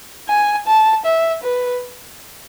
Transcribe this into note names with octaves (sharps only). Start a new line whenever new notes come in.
G#5
A5
E5
B4